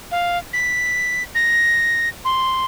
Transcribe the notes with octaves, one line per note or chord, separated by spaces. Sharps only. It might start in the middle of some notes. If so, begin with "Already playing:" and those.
F5
B6
A#6
C6